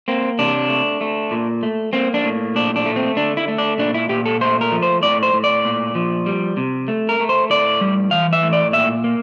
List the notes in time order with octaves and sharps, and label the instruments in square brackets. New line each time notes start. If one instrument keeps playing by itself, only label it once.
[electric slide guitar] A#3 C4
C3 D4
A3
A3
A#2
A3
A#3 C4
D4
A2
A#2 D4
D4
A3
C4
D3 D4
E4
A3
D4
A#2 D4
E4
A#2 G4
A4
A3 C5
A#4
F3
C5
A2 D5
C5
A2
D5
A#2
F3
G3
C3
A3
A#4
A3
C5
A2 D5
G3
E3 F5
E5
A2
D5
A#2 E5
A#3